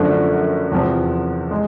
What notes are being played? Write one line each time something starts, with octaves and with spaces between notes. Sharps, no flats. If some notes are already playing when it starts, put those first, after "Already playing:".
Already playing: F#2 D3 F3 A3 D4
E2 C3 F3
G#3